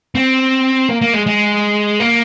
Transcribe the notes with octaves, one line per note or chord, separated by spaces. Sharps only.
C4
A#3
A#3
G#3
G#3
A#3